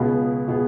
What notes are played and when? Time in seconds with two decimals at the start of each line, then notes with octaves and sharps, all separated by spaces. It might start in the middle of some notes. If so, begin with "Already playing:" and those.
Already playing: C#2 B2 B3 G#4
0.48 B2 B3 G#4